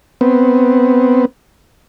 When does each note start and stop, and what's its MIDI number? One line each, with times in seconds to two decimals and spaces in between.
0.21 1.25 59
0.21 1.25 60